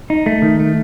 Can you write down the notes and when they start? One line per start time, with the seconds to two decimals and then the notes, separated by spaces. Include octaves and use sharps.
0.10 D#4
0.26 A3
0.42 D#3
0.59 A3